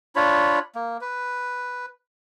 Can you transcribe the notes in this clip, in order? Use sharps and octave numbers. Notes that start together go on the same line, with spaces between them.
D4 F4 C#5 B5
A#3
B4